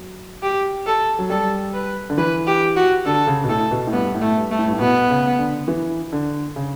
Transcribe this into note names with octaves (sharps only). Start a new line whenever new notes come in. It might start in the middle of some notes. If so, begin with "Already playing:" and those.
Already playing: F#3
G4
A4
F#3
G3 A4
B4
D3
E3 B4
G4
F#4
D3 A4
C#3
B2
A2 A4
B2
A2
G2 B3
A2
A3
G2
A3
A2
G2
A2
B2 B3
C#3
D3
E3
D3
C#3